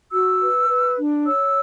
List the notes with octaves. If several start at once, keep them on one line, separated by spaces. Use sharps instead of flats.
F#4 E6
B4
B4
D4
C#5 E6